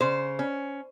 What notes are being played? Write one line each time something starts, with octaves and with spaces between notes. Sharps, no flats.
C#3 C5
C#4